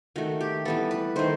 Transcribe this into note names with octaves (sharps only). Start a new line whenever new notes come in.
D#3 A3 F#4
G4
E3 G3 B3 A4
B4
D#3 A3 C5